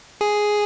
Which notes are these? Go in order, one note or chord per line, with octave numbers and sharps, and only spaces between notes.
G#4